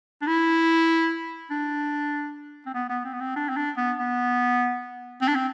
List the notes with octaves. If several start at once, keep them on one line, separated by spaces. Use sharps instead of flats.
D4
E4
D4
C4
B3
B3
C4
B3
C4
D4
C4
D4
B3
B3
C4
D4
C4